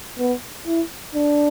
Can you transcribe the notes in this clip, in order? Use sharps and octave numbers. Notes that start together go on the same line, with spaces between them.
B3
E4
D4